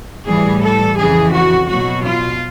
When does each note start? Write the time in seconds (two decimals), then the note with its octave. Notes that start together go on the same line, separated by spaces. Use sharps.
0.26 A2 E3 G3 G#4
0.62 A4
0.97 F2 C#3 E3 G#4
1.33 F#4
1.68 B2 F#3 F#4
2.04 F4